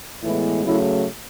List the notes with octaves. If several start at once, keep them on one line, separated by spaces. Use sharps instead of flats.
A2 E3 G#3 B3 E4
C#3 F#3 A3 E4